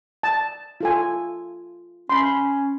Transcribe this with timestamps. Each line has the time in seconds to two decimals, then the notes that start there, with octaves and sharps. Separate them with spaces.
0.23 A5
0.81 F4 A4 G#5
2.10 C#4 B5 C6